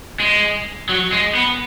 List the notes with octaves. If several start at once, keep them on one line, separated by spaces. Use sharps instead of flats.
G#3
F#3
G#3
B3